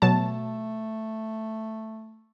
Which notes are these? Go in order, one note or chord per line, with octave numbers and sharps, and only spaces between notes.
B2 F#3 A3 A5